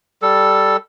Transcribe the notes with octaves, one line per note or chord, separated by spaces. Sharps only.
G3 A4